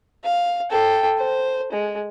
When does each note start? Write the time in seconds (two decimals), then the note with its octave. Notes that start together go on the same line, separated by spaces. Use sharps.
0.24 F5
0.70 A4 G5
1.18 C5
1.72 G#3